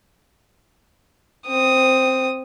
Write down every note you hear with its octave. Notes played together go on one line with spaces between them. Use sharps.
C4 D#6